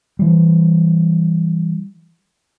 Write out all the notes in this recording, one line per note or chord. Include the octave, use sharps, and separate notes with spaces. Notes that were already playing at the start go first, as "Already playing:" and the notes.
E3 G3